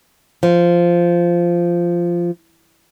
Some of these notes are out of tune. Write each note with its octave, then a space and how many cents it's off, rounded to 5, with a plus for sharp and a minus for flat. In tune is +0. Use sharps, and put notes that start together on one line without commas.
F3 -10